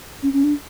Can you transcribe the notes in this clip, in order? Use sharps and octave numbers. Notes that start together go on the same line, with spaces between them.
C#4
C#4
D4